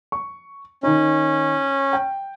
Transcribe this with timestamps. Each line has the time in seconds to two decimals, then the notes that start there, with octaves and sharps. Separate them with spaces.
0.12 C#6
0.83 D#3 C#4 D#4
1.93 G5